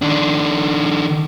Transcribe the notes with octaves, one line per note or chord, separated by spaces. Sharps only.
D#3 D4